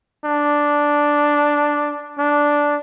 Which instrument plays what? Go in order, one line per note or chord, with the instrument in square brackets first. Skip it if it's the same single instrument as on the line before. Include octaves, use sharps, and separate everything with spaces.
[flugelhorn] D4
D4